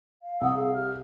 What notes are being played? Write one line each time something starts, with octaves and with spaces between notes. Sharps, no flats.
F5
C2 F#5 D#6 E6
G#4 F5
G4 F6